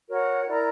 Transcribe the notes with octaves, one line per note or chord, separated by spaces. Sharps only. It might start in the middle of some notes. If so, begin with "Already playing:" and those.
F#4 A#4 C#5 F#5
E4 A#4 D5 A#5